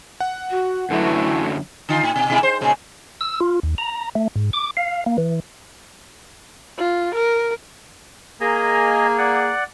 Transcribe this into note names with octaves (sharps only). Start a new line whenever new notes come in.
F#5
F#4
F#2 D3 E3 F#3 A3 E4
D3 D#4 F4
A2
B2
B2 G#3 E4
C5
A#2 C#3 G#3
E6
F4
D#2
A#5
A3
G#2
D6
F5
A#3
E3
F4
A#4
A#3 G#4 D#5 G#5 A#5
D5 F#5